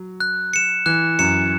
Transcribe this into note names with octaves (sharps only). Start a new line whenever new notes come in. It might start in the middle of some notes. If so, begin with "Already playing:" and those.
Already playing: F#3
F#6
C#7 E7
E3 F#6
F#2 C#7 E7